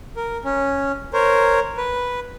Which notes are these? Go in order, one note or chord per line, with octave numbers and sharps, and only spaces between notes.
A#4
C#4
A#4 C5 C#5
B4